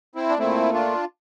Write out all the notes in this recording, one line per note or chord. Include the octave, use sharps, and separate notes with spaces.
C4 E4
D4
A#2 A3 C4 E4
D4 F4